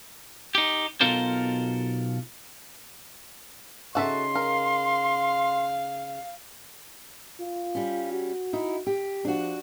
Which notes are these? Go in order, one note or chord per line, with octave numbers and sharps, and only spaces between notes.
D#4 G4
B1 B2 F4 A4 A#4 C5
C#3 D#4 F#4 A4 E5 C6
A#4 F5
F4
G3 C#4
F#4
D#4 E4
G4
F3 D4 F#4